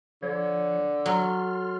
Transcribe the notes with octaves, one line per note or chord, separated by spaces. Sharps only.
D3 F3 C#5
F#3 A4 C6 F6